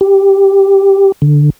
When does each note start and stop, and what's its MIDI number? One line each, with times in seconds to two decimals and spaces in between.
0.01 1.12 67
1.22 1.50 50